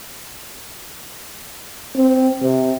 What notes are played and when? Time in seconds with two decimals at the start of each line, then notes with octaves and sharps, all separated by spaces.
1.97 C4
2.42 C3